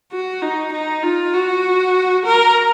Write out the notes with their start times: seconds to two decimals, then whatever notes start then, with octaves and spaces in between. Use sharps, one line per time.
0.12 F#4
0.42 D#4
0.73 D#4
1.03 F4
1.34 F#4
2.25 A#4